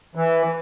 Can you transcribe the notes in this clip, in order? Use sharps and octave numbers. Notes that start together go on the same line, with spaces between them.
E3